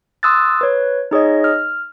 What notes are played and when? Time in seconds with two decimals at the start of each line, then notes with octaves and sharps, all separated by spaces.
0.23 C6 D#6 E6 F#6 A6
0.61 B4 C#5
1.11 D#4 G#4 C#5 D#5
1.44 F6